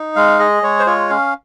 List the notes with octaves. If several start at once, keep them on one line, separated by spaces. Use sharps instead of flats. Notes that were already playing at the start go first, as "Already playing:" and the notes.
Already playing: D#4
G#3 F5
G#4 D#5
G#3 C#5
C5
F4 C#5
C#4 F5